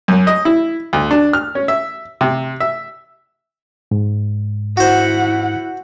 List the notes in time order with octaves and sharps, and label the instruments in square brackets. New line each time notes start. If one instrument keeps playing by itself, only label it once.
[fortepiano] F#2
D#5
E4
D2
D4
F6
C#4
E5
C3
E5
[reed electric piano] G#2
[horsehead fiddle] E4 F#5 [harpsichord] F#4 C5